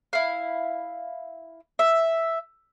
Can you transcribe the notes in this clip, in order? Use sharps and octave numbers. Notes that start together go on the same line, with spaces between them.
E4 F5
E5